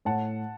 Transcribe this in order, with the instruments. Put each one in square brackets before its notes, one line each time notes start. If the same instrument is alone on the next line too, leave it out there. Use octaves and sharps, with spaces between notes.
[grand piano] A2 [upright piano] F#5 A5